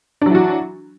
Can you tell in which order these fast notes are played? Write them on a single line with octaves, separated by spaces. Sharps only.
D4 F#3 E3 F#4